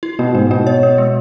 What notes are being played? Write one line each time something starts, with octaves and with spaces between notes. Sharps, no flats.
E4
B2 B3
G#2 B3
B2 B3
C#5
B3
G#3